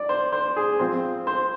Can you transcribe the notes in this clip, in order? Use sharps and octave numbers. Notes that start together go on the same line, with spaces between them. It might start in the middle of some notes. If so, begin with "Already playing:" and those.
Already playing: D5
C5
C5
G#4
F3 C4 C5
C5